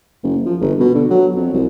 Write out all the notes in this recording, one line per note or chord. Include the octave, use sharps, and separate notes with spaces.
F#1
F3
G1
B2
D3
F#3
F2
C2